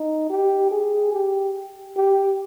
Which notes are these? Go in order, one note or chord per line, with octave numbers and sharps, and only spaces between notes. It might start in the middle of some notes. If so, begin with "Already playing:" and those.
Already playing: D#4
G4
G#4
G4
G4